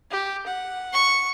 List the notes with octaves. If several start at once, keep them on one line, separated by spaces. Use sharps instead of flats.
G4
F#5
C#6